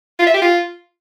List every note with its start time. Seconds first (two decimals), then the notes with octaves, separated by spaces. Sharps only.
0.19 F4
0.27 E5
0.34 G4
0.42 F4